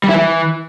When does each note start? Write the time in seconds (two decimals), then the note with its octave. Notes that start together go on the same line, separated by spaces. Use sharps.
0.04 G3
0.09 E4
0.14 E3